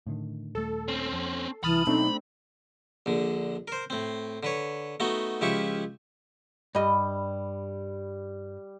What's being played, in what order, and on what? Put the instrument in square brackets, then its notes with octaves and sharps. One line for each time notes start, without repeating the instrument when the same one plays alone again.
[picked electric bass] A2 D3 D#3
[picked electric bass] D#1 A3 [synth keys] A4
[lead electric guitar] C4 C#4
[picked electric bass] F2
[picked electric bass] D#1 C2 [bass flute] E3 [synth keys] A5 D#6 F6 [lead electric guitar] B5
[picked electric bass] B2 F#3 [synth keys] A3 C4 D4 [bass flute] D#4
[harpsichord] A#1 D3
A#4 C5
A2 C4
D3 B4 C#5
A3 B3 D#4 F#4
C#2 F3 E4 G4 E5 C#6
[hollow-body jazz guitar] G2 D#5 [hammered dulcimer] G3